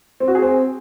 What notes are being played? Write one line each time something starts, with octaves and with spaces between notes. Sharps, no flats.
C4
F#4
G#4
C4